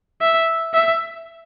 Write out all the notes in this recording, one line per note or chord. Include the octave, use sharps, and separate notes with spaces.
E5
E5